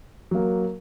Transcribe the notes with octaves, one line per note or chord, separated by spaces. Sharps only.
F#3 A#3